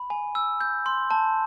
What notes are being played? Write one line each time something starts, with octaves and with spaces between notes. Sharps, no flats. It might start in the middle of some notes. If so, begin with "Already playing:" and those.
Already playing: B5
G#5
E6
G6
C6
A5